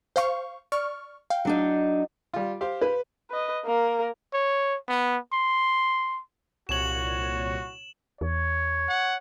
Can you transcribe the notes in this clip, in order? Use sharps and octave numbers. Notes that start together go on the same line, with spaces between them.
C5 F5 C#6
D5 C#6 F6
F5 G5
F#3 D4 D#4
G3 F4
G4 C5 F5
B4
B4 D#5
A#3 A#4
C#5
B3
C6
C2 A#2 F#4 C#5 E7 F#7
E2 C#5
F#5